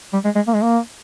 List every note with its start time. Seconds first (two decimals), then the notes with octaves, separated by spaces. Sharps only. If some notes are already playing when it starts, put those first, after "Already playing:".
0.13 G3
0.25 G#3
0.36 G#3
0.48 A#3
0.54 G#3
0.62 A#3